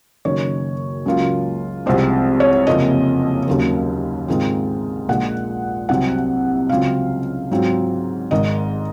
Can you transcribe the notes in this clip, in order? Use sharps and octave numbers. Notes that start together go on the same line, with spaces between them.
F#1 F#2 D#3 C#5
C#2 C#3 F#3 A#3 F4
C2 C3 F3 G#3 C4 C5
C#5
F#1 F2 C3 F3 A#3 D#5
D#2 C#3 F#3 A#3
G#2 D#3 G#3 C4 F4
A#1 A#2 G#3 F#5
C2 C3 F#3 C4 F#5
C#2 C#3 F#3 C4 F4 F5
G#2 F#3 C4 F4
G#1 G#2 D#3 D#5